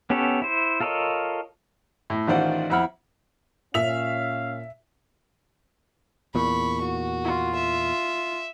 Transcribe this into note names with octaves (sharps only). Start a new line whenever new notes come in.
B3 C#4 G4 A4 C#5
E4 C5
F4 A4 A#4 C#5 D#5
A2
A1 D#3 F4 C5 D5 F#5
F2 E4 F#5 B5 F6
A#2 C#4 E5 F5 F7
E2 A#2 B5 C#6
F#4
F4
E5